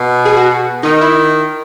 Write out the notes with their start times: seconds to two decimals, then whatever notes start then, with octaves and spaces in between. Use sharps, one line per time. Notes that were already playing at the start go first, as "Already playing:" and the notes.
Already playing: B2
0.25 G#4
0.37 F#4
0.83 D#3 D#4
1.01 E4